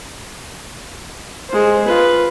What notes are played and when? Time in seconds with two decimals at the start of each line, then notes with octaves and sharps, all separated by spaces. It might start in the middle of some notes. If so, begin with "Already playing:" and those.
1.49 G#3 C5
1.86 F4 B4